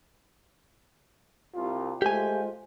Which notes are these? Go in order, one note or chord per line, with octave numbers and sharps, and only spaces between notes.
C2 F4
G#3 A3 F4 G4 C5 G#5